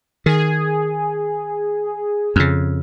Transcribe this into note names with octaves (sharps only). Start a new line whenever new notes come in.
D#3 G#4
F2 C#3